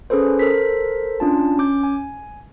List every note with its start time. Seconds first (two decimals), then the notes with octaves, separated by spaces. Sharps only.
0.10 C#4 G#4 A4 B4 C5
0.39 A4 A#4 C5 B6
1.20 C#4 D4 F4 A5
1.58 C#4 D6 G6
1.83 G#5